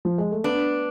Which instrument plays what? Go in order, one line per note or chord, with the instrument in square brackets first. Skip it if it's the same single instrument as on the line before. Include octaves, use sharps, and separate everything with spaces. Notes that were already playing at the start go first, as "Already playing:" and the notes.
[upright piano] F3
G#3
A3
[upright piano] B3 [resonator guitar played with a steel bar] D4